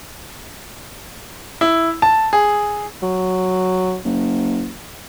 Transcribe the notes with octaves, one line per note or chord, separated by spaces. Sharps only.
E4
A5
G#4
F#3
F#1